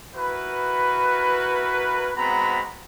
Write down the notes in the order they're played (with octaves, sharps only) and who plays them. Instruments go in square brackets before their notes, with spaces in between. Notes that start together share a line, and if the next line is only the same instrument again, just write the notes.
[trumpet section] E4 F#4 A#4 B4
G#3 B3 C4 F#4 A#5 B5